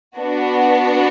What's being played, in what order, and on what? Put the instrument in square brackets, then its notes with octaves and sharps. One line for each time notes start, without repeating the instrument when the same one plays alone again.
[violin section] B3 D4 F#4